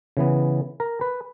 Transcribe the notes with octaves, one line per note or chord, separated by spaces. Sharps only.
C#3 E3 B3
A#4
B4